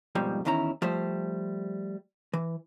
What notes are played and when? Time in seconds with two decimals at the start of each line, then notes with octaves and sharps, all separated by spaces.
0.15 F2 G#2 B2 F3 G3
0.45 E2 D#3 C#4 E4 A#5
0.82 F3 G3 A3 C5
2.33 E3